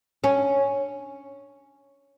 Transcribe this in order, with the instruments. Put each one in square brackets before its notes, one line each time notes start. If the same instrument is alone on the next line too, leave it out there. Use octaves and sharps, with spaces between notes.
[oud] C#4